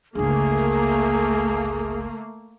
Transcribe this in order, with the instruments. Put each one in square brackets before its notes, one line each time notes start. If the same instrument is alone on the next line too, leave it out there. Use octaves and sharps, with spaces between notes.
[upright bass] G1 C#2 [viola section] A3 A#3 [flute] G#4